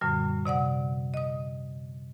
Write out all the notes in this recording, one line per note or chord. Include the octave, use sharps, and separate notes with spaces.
F#2 A#2 D3 G3
C3 D5 F#5 D#6
D#5 D#6